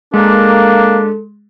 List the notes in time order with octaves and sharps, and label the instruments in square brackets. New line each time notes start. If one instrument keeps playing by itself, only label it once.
[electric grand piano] G#3 [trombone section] A#3 [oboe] D4 [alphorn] A4